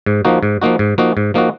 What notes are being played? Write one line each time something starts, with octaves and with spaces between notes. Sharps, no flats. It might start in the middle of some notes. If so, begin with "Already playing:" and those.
G#2
F3 A#3 D#4 F#4
G#2
F3 A#3 D#4 F#4
G#2
F3 A#3 D#4 F#4
G#2
F3 A#3 D#4 F#4